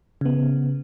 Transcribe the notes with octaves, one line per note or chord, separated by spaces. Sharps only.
C#3 B3